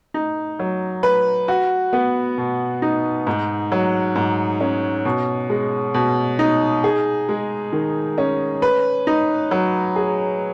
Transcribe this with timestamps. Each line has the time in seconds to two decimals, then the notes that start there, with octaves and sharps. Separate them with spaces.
0.14 D#4
0.59 F#3
1.03 B4
1.48 F#4
1.93 B3
2.38 B2
2.82 D#4
3.27 G#2
3.72 F#3
4.16 G#2
4.61 C#4
5.05 B2
5.50 G#3
5.94 B2
6.39 D#4
6.84 G#4
7.29 G#3
7.73 D#3
8.18 C#4
8.62 B4
9.07 D#4
9.51 F#3
9.96 G#4